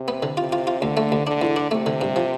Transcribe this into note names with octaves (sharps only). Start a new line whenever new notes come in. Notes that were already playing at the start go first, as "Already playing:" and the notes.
Already playing: C3
B3
D3
C3 F4
F4
F4
D2 D3
A3
D2
D3 D4
E2
D4
C3 A3
D3
G2
F3